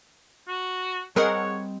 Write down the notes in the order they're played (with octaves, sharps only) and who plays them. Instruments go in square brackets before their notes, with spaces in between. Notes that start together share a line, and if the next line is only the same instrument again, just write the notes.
[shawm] F#4
[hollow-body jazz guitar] G3 C4 D#5 [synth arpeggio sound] G#4 A#4 F#5 [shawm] C#5